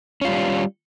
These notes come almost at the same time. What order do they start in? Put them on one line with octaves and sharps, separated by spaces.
C#4 F4 G3